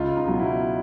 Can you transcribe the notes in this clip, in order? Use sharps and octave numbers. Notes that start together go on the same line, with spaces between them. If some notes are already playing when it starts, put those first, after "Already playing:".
Already playing: C#2 F4
D#4
B2 F#3
E4